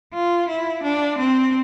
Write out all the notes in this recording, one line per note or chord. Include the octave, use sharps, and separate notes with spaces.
F4
E4
D4
C4